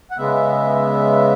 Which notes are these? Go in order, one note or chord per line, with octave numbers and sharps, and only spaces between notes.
F#5
C#3 G#3 B3 E5